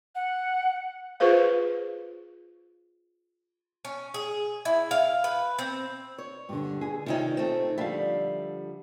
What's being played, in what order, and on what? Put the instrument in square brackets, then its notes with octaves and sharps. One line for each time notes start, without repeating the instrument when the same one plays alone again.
[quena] F#5
[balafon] F4 G#4 B4 C5 F5
[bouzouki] C#4
G#4
E4
F5
B4
C4
[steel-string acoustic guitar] C#5
[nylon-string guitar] G2 D3
G#4
[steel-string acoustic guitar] C3 D#3 C#4 [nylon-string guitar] D#4 F4
[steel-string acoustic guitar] A3 C4
[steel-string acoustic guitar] D3 F3 G3 [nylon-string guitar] E5 F5